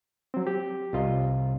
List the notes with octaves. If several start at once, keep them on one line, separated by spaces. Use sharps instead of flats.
F#3 C4
G4
C2 F4 D#5